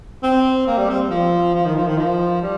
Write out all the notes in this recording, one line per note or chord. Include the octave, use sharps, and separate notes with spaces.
C4
A#3
G3
C4
F3
F3
D#3
F3
D#3
F3
G3